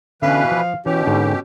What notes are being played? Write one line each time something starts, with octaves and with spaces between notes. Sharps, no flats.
B2 D3 E3 C#4 B4 F5
F3
B2 E3 C#4 G4
G#2 D3